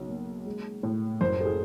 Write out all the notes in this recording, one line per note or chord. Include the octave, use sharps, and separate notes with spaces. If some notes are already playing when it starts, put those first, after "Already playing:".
Already playing: B1 C#3 C#5
A#3
G#3
A2
F#1 C5
A4
G#4